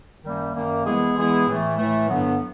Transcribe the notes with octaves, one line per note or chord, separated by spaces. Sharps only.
F#2 D#3 G3 A#3
F#2 D#3 G3 A#3
E3 G#3 B3 E4 G#4
E3 G#3 B3 E4 G#4
A2 E3 A3
A2 E3 A3
G2 D3 F#3 B3